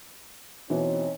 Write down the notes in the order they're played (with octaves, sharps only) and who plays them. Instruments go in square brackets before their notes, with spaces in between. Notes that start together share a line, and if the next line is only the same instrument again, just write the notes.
[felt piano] B2 E3 [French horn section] C4 D#4 C#5